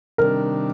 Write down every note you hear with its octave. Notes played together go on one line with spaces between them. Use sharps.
C3 D#3 G3 D4 A#4